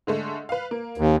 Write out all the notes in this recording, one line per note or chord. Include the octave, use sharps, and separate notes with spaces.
D3 G#3 A3
B4 F5
A#3
D#2